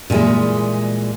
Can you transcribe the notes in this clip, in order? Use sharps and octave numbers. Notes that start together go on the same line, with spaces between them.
A#2 D3 E3 G3 G#3